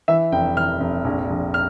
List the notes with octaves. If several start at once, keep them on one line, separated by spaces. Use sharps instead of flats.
E3 E5
F1 G5
E3 F6
F1
A#1
A#1
F6